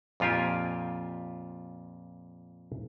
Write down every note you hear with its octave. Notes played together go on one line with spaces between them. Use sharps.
F2 A#2 F4 G4 G#5